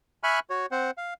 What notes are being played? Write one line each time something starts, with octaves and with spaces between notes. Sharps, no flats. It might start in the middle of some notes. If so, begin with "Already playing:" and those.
E5 G#5 B5 C#6 F6 F#6
F#4 C#5
C4 C5 F#5
F5